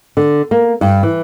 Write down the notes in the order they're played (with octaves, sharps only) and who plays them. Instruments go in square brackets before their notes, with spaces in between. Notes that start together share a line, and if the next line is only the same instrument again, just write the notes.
[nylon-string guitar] D3
A#3
G2
E3